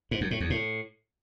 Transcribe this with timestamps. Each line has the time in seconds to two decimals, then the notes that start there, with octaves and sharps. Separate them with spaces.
0.11 G#2
0.21 F#2
0.31 A2
0.40 E2
0.50 A2